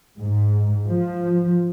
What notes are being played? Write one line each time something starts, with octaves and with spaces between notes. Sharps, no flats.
G#2
F3